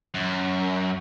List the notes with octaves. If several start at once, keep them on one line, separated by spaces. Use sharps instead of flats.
F#2